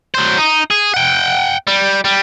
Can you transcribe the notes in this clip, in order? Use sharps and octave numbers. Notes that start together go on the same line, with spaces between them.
F#3 C5
D#4
G#4
F#5 G5
G3
G3